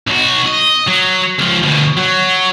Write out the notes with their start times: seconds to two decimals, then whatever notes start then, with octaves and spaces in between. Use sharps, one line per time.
0.07 B1 F#4
0.46 D#5
0.88 F#3
1.39 C#2 F3
1.63 D2 B2
1.98 F#3